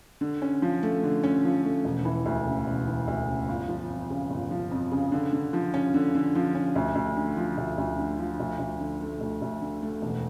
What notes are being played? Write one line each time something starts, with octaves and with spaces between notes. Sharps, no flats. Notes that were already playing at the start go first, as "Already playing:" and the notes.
D3
C#4
F3
A3
D3
C#4
F3
A3
E1
E3
D2
C#3
E1
E3
D2
C#3
G1
F3
F2
C#3
G1
F3
F2
C#3
D3
D3
F3
C#4
D3
D3
F3
C#4
D2
D2
D3
F3
D2
D2
D3
F3
D2
D2
D3
A3
D2
D2
D3
A3
E1